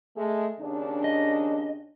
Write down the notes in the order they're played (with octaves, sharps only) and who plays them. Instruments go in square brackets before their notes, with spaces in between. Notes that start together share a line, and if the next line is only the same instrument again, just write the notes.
[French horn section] G#3 A3
D#2 C#3 D4
[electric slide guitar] D#5